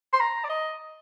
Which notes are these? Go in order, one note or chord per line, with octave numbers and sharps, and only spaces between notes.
C6
A#5
D5
D#5